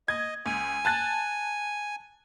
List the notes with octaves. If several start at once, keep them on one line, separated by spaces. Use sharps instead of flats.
D#5 G#6
C#2 G#5
A5 F#6 A6